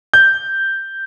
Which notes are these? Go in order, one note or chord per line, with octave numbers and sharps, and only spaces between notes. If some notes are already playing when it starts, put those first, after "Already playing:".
G6